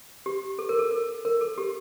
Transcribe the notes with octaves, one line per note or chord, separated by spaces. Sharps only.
G4
A4
A#4
A4
A#4
A#4
A4
G4